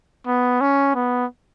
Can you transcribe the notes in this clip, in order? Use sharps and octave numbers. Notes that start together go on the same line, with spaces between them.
B3
C#4
B3